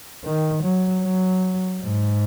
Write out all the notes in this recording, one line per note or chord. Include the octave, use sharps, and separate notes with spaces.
D#3
F#3
F#3
G#2